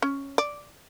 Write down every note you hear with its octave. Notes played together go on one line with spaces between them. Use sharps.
C#4
D5